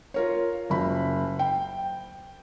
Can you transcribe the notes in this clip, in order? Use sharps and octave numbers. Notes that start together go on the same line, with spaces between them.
F4 A#4 C#5
F#1 B5
G5